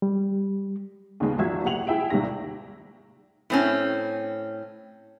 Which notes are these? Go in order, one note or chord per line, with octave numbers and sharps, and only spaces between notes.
G3
D#2 G#2 C#3 G#3 B3
G#1 F3 F#4 E5 G#6
F#1 C2 G4 F#5 F7 F#7
E4 G#4 E5 G5 D7
G#1 D#2 C3 D#3 A#6
A2 C4 C#4